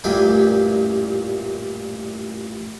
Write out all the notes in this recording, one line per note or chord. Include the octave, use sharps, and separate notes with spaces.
A1 F#2 A#2 G3 G5 G#5